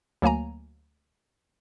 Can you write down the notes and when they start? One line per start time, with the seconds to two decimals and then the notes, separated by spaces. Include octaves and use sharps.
0.22 D2 F#3 A#3 G#5 A#5